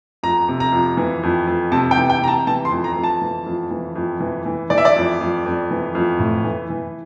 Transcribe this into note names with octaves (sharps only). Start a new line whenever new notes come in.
F2 A#5
C3
A#5
F2
E3
F2
F2
C3 A5
G5
E3
G5
C3 A#5
A5
E3 A5
C6
F2
A#5
F2
A5
E3
F2
E3
F2
E3
E3
E3 D5
E5
D5
F2
F2
F2
E3
F2
A2
E3
E3